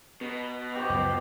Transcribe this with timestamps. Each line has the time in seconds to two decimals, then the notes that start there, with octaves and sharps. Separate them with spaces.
0.21 B2 B3 A#4
0.76 G4 C5 C#6
0.90 C#2 F#2 F3